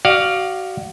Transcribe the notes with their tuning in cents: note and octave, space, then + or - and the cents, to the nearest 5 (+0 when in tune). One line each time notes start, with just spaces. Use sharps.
F#4 +30 D5 +30 F5 +0